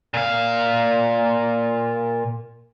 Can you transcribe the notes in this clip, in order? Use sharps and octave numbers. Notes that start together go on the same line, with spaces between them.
A#2 F5